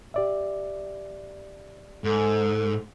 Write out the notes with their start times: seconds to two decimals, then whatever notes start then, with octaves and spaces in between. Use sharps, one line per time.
0.14 G4 D5 E5
2.04 G#2 A4